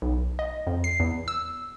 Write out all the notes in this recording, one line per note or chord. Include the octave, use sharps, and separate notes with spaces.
B1
D#5
F2
C7
E2
E6